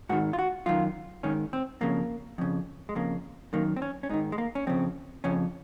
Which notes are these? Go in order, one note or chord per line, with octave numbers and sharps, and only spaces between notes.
G#2 D#3 F#4
F4
F#4
F#2 D#3 F4
G#2 D#3 C#4
C4
F2 C#3 A#3
F2 C#3
G#3
F2 C#3 A#3
F#2 D#3 A#3
C4
C#4
C#4
G#2 D#3 D#4
G#3
A#3
C#4
F2 C#3 C4
F2 C#3 C#4